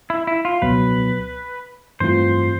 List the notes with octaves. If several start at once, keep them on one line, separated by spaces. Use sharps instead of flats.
E4
E4
F4
C#2 B2 F#3 B3 B4
G2 E3 A3 C4 F4 C5